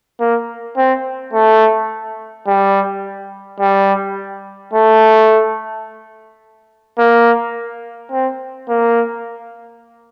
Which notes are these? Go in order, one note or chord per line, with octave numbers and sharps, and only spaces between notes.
A#3
C4
A3
G3
G3
A3
A#3
C4
A#3